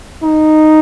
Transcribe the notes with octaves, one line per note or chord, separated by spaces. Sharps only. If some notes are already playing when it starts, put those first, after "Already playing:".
D#4